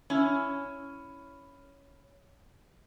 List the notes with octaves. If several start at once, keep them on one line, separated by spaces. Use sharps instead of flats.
C#4 E4